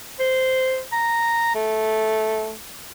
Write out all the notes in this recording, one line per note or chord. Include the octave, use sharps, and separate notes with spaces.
C5
A#5
A3